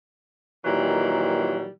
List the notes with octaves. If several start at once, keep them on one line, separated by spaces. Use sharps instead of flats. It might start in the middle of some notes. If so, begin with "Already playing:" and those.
A#2 D#3 E3 F#3 G3